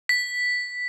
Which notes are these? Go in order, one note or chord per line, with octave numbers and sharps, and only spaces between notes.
B6